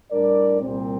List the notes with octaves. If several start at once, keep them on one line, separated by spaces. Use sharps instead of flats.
A2 G3 D4 A#4 D5
C2 A#2 G3 C4